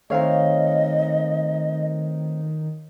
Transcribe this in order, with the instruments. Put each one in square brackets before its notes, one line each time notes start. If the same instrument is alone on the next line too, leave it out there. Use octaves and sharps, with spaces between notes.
[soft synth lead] D#3 [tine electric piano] A3 C4 D#4 [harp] C#5 F5 [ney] D#5